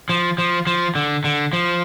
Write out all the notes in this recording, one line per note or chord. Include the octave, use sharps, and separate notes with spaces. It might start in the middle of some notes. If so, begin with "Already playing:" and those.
F3
F3
F3
D3
D3
F3